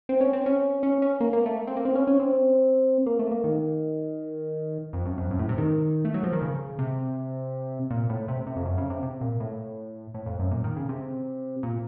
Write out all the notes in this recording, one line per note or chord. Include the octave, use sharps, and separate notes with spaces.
C4
C#4
C4
C#4
C#4
C#4
A#3
A#3
A3
C4
A#3
C4
C#4
C#4
C4
A#3
A3
A#3
D#3
F2
F#2
F2
F#2
A2
C3
D#3
A3
F#3
F3
D#3
C#3
C3
A#2
A2
C3
C3
F2
F#2
C#3
C3
C3
A#2
A2
A2
F2
F#2
A#2
D#3
C#3
C3
A#2